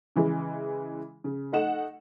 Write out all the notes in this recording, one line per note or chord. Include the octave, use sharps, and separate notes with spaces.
C#3 E3 G#3
C#3
A3 D#4 F#5 E7